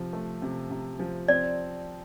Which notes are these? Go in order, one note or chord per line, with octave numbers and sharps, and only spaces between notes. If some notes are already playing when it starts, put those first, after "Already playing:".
Already playing: C3 F3
A3
C3
C3
F3
C4 D5